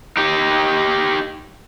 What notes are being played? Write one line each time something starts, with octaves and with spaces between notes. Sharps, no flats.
D#4 G4